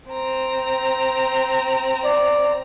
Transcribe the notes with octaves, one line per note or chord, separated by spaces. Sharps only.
C4 A#5
D5